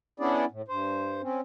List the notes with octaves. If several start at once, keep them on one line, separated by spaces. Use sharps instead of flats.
B3 C#4 D4 E4 G#4 D5
A2
G2 C5
C4 C#4